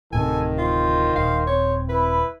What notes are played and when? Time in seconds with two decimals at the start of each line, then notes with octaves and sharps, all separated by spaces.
0.12 D1 A2 C3 D#3 A4 G#5
0.58 F4 C5
1.16 D#1 F5
1.47 C4 C#5
1.89 E4 B4